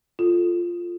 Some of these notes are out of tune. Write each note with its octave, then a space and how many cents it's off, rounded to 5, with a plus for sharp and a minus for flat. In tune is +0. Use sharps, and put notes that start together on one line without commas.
F4 +0 A4 +0